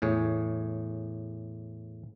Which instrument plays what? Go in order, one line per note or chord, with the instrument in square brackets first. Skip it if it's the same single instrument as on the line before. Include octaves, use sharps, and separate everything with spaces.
[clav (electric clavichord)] E2 A2 G#4 C#5